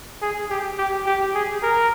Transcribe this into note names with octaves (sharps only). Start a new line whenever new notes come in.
G#4
G4
G4
G4
G#4
A#4